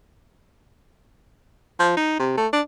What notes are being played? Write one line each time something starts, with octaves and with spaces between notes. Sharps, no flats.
F3
D#4
C3
A3
D4